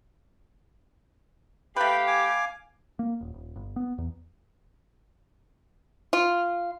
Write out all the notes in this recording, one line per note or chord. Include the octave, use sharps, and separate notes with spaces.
A3 G4 B4 F5 G5 B5
G#5 D6
A#3
D#1
D#1
G1
B3
E2
F4